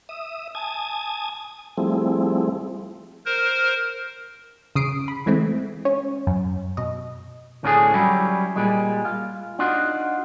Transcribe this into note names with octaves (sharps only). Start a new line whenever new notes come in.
E5 D#6
G#5 A5 D#6 G#6
F3 G3 A3 C4 E4 G#4
A#4 C5
C#3 D#6 C7 D7
B5
E3 G#3 A3 C4
C#4 C#5
F#2
B2 D#5
D2 A2 C#4 D4 F#4 G#4
F#3 G3 C#4 E4
A#2 G3 G#3
F4
D4 D#4 F4 F#4